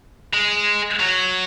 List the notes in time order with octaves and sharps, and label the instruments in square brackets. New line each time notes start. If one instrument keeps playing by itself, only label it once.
[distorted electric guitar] G#3
F#3